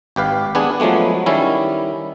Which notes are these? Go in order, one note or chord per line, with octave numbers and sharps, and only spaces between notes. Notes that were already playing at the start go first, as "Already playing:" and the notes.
G#1 G4 B4 F5
B3 D4 G#4
F3 F#3 G#3 A3 B3
D#3 G3 C#4 E4